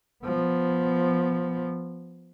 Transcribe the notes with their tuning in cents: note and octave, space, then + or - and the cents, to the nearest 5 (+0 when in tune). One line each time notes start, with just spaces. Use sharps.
F3 +0 B3 +0